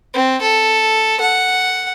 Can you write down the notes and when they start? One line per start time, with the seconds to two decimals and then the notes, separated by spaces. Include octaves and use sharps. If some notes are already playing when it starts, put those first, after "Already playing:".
0.14 C4
0.42 A4
1.21 F#5